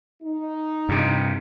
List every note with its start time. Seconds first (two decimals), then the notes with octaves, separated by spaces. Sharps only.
0.23 D#4
0.89 G2 C3